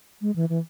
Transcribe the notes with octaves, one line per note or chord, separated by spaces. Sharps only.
G#3
E3
E3